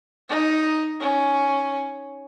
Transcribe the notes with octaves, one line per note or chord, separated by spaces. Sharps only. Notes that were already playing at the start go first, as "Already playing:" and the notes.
D#4
C#4